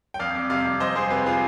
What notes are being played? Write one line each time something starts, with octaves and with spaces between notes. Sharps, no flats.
G5
F2 D5 F5
F2
C3 D5 F5
F2
F2 C5 D#5
F2 G#4 C5
C3 G4 B4
F4 G#4